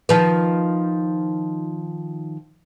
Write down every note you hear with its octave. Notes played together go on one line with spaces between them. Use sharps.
D#3 F3 B4